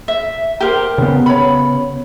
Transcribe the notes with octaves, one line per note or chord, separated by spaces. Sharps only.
E5
G4 A#4 C5
C#3 B3
C#5 B5